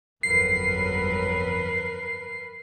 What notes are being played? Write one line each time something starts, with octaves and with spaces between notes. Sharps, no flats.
G1 F2 F#3 A#4 B4 C7